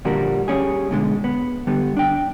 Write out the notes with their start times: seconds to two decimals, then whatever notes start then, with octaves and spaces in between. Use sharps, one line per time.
0.05 A#2 D3 F3 G3 F#4 A#4
0.48 G3 C#4 G#4
0.91 B2 D3 G#3
1.24 B3
1.67 D3 G3 B3
1.97 D4 G5